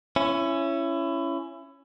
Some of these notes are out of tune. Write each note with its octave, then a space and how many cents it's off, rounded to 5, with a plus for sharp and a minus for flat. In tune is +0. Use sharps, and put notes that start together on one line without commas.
C#4 +0 E4 +25